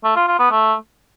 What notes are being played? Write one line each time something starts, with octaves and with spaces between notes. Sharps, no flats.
A3
F4
F4
B3
A3